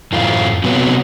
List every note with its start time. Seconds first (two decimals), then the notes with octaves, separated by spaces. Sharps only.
0.12 F#2 A2 E3 A3 F4
0.64 C3 F#3 B3